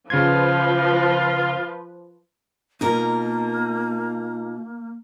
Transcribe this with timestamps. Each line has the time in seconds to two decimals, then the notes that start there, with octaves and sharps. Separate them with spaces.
0.10 C#3 F3 F4 B4 G#6
2.81 B2 A#3 D#4 F4 A#4